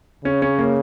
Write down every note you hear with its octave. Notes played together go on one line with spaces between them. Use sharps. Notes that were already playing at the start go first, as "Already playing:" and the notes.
C#3 C#4
C#4
A#3